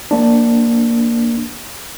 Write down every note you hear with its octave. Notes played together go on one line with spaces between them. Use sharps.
A#3 D4